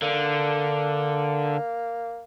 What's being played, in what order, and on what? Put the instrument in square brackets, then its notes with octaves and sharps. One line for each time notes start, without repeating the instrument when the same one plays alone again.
[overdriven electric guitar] D3 [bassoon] A#3